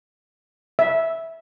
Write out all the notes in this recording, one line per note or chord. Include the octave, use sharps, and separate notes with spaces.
E5